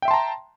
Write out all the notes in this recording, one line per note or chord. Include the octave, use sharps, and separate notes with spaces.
E5 G5 A5 A#5 C6